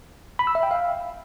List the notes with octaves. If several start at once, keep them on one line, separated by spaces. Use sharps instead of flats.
B5
E6
E5
G5
F5